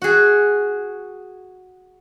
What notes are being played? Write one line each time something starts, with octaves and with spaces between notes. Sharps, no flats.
F#4 G#4